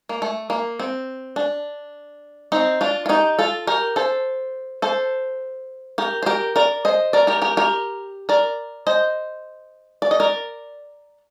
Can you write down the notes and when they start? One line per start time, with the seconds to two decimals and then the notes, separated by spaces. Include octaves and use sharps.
0.09 A#3
0.22 A3
0.50 A#3
0.80 C4
1.36 D4
2.52 C4 D#4
2.81 D4 F4
3.06 F4
3.09 D#4 G4
3.39 F4 A4
3.67 G4 A#4
3.96 A4 C5
4.82 A4 C5
5.98 G4 A#4
6.23 C5
6.26 G4 A#4
6.56 A#4 D5
6.85 C5 D#5
7.13 A#4 D5
7.27 G4 A#4
7.42 G4 A#4
7.57 G4 A#4
8.29 A#4 D5
8.87 C5 D#5
10.02 D5
10.11 D#5
10.20 A#4 D5